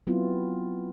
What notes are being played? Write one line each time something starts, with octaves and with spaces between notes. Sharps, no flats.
F#3 B3 C4 E4 F4